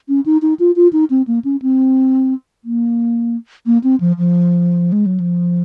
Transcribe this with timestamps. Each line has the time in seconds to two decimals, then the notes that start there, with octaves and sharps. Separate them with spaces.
0.09 C#4
0.26 D#4
0.42 D#4
0.59 F4
0.76 F4
0.93 D#4
1.10 C4
1.27 A#3
1.44 C#4
1.62 C4
2.64 A#3
3.66 A#3
3.83 C4
4.00 F3
4.18 F3
4.92 G#3
5.06 F#3
5.20 F3